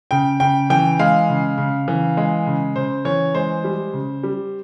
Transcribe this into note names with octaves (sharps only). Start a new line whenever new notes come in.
C#3 G5
C#3 G5
E3 G5
G#3 F5
C#3
C#3
E3
G#3
C#3
C#3 C5
E3 C#5
G#3 C5
G3
C#3
G3